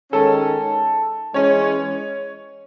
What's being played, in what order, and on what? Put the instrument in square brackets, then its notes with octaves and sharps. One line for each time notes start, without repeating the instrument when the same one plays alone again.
[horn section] D#3 G#3 C#4 [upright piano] A4
[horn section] E3 G#3 C#4 [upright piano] C#5